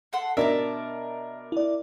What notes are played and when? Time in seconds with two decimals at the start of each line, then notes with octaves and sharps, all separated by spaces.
0.13 A4 F#5 C6
0.37 B2 D4 A#4 D5 E5 A5 A#5
1.52 E4 D5